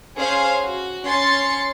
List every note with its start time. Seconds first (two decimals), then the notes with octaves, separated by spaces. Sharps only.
0.18 C#4 G#4 C5 F5
0.64 F#4
1.05 C#4 C6 A6 C#7